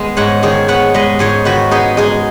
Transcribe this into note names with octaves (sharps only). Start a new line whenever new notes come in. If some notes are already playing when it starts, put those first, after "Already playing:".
Already playing: D#3 G#3 B3 D#5
G#2 C#5 F#5
D#3 G#4 C#5
B3 C#5 F#5
G#3 B4 D#5
G#2 G#4 C#5
D#3 F#4 B4
B3 D#4 G#4
G#3 D#4 G#4